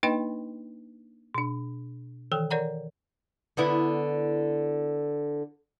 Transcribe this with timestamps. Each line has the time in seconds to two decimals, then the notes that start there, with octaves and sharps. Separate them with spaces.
0.03 A#3 D4 D#4 B4 D#5 G5
1.35 B2 D4
2.32 D#3 E3 A4 G5
2.51 A#4 C#5 D5 F#5 A#5
3.57 D3 B3 E4